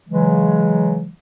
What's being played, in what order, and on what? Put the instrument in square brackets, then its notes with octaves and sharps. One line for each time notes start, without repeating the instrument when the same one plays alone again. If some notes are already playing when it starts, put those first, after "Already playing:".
[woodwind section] C#3 E3 F#3 G#3